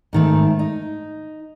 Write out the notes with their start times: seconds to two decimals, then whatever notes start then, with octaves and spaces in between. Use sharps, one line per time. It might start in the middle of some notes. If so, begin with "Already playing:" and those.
0.13 G#2 D#3 A3
0.59 D#4